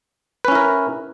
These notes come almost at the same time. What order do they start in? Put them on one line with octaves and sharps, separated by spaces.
B4 C#4 E4 A#4